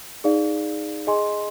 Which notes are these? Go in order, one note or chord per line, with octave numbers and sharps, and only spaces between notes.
D#4 G#4 D5 F5
G#4 D#5 G#5 C6